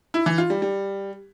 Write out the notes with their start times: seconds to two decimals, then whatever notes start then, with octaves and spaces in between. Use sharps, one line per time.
0.14 E4
0.26 E3
0.38 F4
0.50 G3
0.62 G3